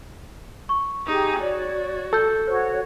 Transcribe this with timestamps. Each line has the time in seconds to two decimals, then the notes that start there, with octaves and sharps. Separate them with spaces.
0.69 C#6
1.06 D#4 G4 G#4
1.40 F#4 C#5 D5
2.13 A4 E6 G6
2.47 F#4 C5 C#5